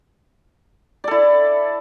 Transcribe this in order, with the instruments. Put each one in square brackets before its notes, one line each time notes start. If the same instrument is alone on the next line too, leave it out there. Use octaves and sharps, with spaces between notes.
[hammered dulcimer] D5
A4
E4